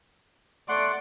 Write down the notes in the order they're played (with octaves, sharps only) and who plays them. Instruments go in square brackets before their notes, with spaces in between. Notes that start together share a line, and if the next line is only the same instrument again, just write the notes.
[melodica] A3 F#5 C6 [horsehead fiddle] D5